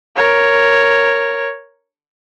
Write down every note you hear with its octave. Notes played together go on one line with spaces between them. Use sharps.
A#4 C#5